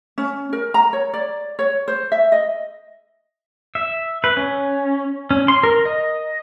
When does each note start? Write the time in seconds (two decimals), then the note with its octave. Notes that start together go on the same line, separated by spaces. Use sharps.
0.18 C#4
0.53 A#4
0.74 A#5
0.93 C#5
1.14 D5
1.59 C#5
1.88 C5
2.12 E5
2.32 D#5
3.75 E5
4.24 B4
4.37 C#4
5.31 C#4
5.48 C6
5.63 A#4
5.85 D#5